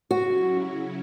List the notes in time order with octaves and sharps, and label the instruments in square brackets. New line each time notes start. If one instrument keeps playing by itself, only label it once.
[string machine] C#3 F#3 C#4 E4 [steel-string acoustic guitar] F#4